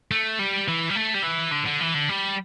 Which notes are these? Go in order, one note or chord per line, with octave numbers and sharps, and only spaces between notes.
A3
G3
E3
G3
A3
G3
E3
D3
D3
E3
D3
G3